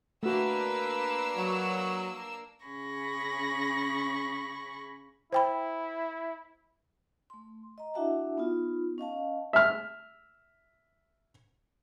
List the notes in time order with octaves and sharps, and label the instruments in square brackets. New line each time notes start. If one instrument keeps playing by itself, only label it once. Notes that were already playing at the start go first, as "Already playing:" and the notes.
[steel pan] A3 F#4 [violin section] A#3 D4 E6 [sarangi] B4
[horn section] F#3
[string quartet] C#3 C#4 G#4 B5 C#6 A#6
[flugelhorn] E4 [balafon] C5 G5 B5
[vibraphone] A3 C6
D#5 A#5
D4 E4 F#4 E5 F#5 A5
B3 D#4 F4
C#4 D#5 F5 A5
[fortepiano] E5 F6